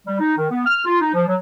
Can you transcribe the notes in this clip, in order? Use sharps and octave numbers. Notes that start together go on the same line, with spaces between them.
G3
D#4
D#3
B3
F6
F4
D#4
F3
F#3